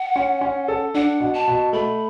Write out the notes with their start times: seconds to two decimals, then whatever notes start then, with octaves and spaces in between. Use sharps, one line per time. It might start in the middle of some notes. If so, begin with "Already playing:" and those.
Already playing: F#5
0.15 C#4
0.41 C#4
0.68 A4
0.94 D4 F#5
1.20 B2
1.34 A5
1.48 B2
1.73 A3 B5